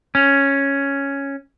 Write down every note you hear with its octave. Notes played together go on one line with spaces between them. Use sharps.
C#4